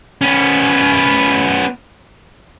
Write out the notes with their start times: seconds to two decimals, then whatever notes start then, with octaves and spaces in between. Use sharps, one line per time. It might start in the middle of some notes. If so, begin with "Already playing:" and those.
0.21 B3 C#4